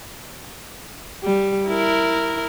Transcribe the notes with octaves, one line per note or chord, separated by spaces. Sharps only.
G3
E4 A#4